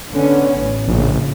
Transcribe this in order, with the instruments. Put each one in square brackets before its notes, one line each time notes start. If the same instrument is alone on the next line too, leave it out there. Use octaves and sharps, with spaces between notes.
[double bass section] D3 B3 C#4
A1
[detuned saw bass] A#1 [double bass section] C#3